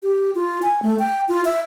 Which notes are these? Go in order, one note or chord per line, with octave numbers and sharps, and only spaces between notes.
G4
F4
G#5
A3
G5
F4
E5